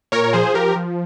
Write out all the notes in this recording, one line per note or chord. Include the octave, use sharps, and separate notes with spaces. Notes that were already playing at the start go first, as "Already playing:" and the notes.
A#2 A#4 C#5
A#4
F3 G#4 C5
F3 G4 A#4
F3